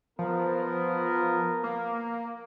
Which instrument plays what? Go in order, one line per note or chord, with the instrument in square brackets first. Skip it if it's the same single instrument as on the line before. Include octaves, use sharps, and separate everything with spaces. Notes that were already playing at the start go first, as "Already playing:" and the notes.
[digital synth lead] F3 [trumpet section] B3 A#4
[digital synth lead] A#3